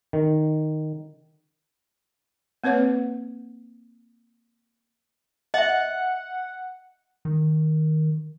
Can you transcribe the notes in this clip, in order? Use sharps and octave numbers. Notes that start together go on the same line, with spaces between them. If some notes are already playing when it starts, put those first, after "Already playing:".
D#3
A#3 C4 B4 C#5 F#5
D#5 E5 F#5
D#3